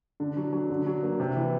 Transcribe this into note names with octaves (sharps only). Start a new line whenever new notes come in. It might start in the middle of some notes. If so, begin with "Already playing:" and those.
D3
F#3
F#3
D3
F#3
A#3
C3
E3